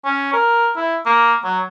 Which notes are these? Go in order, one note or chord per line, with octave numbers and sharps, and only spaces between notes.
C#4
A#4
E4
A#3
F#3